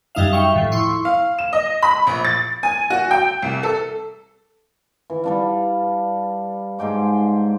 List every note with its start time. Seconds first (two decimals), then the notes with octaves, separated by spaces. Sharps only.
0.15 F#2 G3 D#4 E5 F5
0.33 E5 F5 G5 C#6
0.54 D#2 A2 F3
0.72 E4 C6 C#6
1.05 F5
1.39 E7
1.53 D#5
1.83 B5
2.07 A#1
2.25 A6
2.63 G#5
2.90 F#4
3.11 G5
3.42 C2
3.63 A4
5.10 E3
5.24 G3 D4 F5
6.79 G#2 G#3 G5 D6